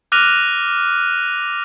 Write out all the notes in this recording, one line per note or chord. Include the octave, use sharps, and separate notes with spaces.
D6 F6 F#6 A#6 D#7 F7